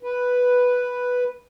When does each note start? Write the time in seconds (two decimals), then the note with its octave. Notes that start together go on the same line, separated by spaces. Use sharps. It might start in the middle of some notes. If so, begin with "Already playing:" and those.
0.03 B4